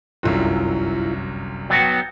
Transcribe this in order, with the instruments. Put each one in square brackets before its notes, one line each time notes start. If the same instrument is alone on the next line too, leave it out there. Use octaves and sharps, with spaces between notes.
[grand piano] G1 C2 F#2 [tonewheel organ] E4 F4
[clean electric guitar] F#3 B3 F#4 [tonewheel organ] G5